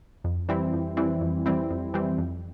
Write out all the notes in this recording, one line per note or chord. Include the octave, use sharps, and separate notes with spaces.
F2
E3 G3 C4 E4
F2
E3 G3 C4 E4
F2
E3 G3 C4 E4
F2
E3 G3 C4 E4
F2